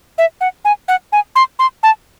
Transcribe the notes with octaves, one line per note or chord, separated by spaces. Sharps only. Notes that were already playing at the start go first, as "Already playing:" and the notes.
E5
F#5
G#5
F#5
G#5
C6
C6
A5